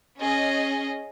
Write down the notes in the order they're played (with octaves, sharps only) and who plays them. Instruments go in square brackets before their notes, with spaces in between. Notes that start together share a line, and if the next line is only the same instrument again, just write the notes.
[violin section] C#4 G#4 D#5